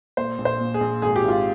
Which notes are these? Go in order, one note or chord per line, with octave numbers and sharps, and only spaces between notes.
A#2 C5
A#1
C5
A#2
G#4
A#1
G#1 G#4
G4
G#1 F4